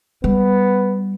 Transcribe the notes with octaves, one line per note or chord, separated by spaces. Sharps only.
G3 B3